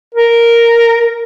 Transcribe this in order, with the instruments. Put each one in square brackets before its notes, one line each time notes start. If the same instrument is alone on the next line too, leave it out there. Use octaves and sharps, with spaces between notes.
[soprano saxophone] A#4